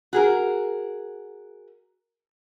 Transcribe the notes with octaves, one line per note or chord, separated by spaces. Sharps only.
F#4 G#4 A#4